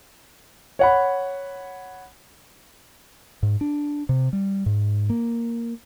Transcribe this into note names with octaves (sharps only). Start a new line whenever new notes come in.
C#5 F#5 B5
G#2
D4
C3
G3
G#2
A#3